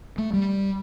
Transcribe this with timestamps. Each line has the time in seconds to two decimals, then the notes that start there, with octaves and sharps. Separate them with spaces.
0.18 A3
0.33 G3